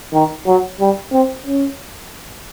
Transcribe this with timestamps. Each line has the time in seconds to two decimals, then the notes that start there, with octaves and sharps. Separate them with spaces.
0.14 D#3
0.46 F#3
0.80 G3
1.12 C4
1.46 C#4